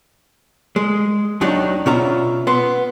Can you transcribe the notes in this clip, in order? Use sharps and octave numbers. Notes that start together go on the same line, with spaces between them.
G#3
D#2 D#3 F#3 D4 D#4
B2 C#4 F4 E5 A#5
B3 C6